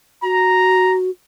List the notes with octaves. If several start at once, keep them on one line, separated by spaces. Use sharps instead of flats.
F#4 A#5